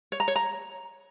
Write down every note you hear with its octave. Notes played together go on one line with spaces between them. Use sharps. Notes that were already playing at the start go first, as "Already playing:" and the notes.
C#5
A#5
C#5
A#5